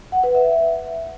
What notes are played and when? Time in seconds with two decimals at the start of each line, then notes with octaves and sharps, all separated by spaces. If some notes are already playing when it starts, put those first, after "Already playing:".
0.12 F#5
0.24 B4
0.35 E5